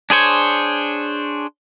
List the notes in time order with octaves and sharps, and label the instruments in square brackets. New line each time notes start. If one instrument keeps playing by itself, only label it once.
[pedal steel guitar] D4 G#4 C5 C#5